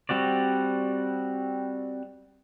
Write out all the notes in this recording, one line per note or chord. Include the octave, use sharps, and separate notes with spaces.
G3 C4 F#4 D5